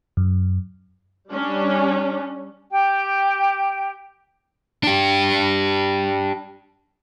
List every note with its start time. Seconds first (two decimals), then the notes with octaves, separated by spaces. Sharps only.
0.17 F#2
1.33 G3 C#4 D4
2.72 G4 G5
4.83 D4 G4